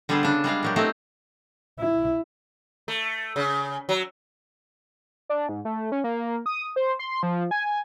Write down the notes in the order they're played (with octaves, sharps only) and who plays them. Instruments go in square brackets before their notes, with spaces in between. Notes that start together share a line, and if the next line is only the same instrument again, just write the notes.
[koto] D3 G3 B3 G#4 A4 C5
C#3 D4
G3 G#3 D4 F5
A#2 F#3 G4
A3 B3 C4 D#4 E4 G4
[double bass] E4
[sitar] A3
C#3
F#3
[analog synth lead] D4
G#2
A3
C#4
A#3
D#6
C5
C6
F3
G#5